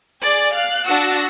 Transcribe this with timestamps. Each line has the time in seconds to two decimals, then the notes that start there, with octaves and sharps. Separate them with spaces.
0.22 G#4 D5
0.53 F5 F#6
0.88 D4 F#4 F#5 E6 A#6